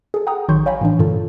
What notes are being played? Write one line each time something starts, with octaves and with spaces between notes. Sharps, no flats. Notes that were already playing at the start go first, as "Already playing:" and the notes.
G#4 A4
F#5 G5 A#5 D#6
A1 D#3 F#3 C6 C#6 G6
C#5 F5 G5 G#5 A#5 B5
A2 E3 D4
G2 A#2 D3 F4 A4